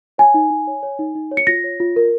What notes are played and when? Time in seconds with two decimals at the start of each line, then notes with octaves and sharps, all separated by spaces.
0.18 C#5 G#5
0.34 D#4
0.50 D#4
0.67 C#5
0.83 C#5
0.99 D#4
1.15 D#4
1.31 C#5
1.37 C#7
1.47 F4 A#6
1.64 C#5
1.80 F4
1.96 A#4